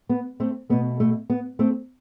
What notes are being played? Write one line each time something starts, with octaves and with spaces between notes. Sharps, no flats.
B3
A3 C4
B2 A3 B3
A3
B3
A3 C4